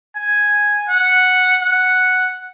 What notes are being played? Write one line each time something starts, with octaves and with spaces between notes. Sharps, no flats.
G#5
F#5
F#5